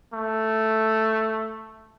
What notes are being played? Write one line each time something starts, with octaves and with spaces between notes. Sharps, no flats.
A3